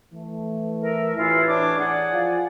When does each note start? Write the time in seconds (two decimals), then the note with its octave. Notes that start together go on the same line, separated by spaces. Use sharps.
0.13 E3 A3
0.81 A#4 E5
1.17 A1 E3 E4 F4
1.47 D4 C#5 D6
1.78 G#4 D5 F#5
2.13 F3 F5 G#5